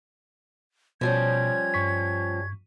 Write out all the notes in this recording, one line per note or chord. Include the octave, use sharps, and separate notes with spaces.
B2 F3 G3 C#4 G#6
G2 C#6 B6